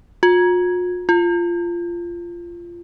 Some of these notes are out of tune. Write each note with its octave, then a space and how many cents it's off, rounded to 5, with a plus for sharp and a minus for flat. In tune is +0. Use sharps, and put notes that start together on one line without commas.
F4 +45
F4 -15